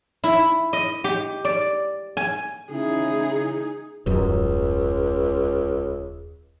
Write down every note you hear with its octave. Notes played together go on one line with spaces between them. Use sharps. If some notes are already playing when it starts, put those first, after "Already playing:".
E4
D#5
G4
D5
G#5
C#3 D#4 E4 G#4
D#1 C#2 F#2